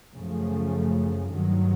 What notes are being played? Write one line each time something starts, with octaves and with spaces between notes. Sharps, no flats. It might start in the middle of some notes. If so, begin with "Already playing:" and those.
F#2 C#3 F3 A3
G2 D#3 F#3